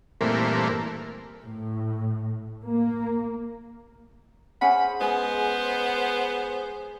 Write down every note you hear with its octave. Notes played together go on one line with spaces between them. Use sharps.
G2 A#2 E3 A3 A#3 C4
A2
A#3
C#4 G#4 C5 F#5 G#5 B5
G#3 B3 G#4 C5 D#5